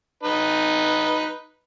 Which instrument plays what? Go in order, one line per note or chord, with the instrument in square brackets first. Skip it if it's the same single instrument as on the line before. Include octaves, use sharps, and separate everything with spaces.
[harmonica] D#4 B4